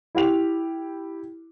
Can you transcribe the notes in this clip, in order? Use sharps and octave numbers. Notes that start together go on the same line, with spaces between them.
E4 G4 F7